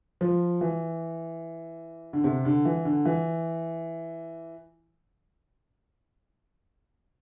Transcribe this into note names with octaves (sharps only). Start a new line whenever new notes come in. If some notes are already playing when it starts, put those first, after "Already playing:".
F3
E3
D3
C3
D3
E3
D3
E3